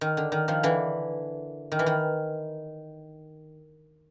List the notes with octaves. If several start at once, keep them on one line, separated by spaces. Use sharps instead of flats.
D#3
D3
D#3
D#3 F3
D3 E3
D#3
E3
D#3